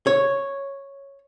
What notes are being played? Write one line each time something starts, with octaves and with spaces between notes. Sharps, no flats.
C#5